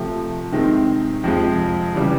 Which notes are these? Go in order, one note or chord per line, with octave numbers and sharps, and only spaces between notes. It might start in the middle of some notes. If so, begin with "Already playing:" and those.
Already playing: C3 F3 A3
C3 D#3 G#3 C4
F2 C3 F3 G#3
C#3 E3 G3